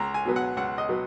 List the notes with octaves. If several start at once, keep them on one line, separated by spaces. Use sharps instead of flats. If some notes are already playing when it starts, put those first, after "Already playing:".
Already playing: C#2 A#5
G#5
B2 F#3 B3
F#5
C#2 F#5
D#5
B2 F#3 B3